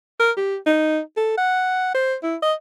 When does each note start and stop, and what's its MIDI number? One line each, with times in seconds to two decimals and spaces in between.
0.20 0.31 70
0.37 0.57 67
0.66 1.00 63
1.17 1.35 69
1.37 1.92 78
1.94 2.15 72
2.23 2.36 64
2.42 2.54 75